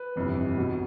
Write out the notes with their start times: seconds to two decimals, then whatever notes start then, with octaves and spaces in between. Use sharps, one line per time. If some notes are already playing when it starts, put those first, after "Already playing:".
Already playing: B4
0.16 G1 F2 C3 E3
0.57 B1 B2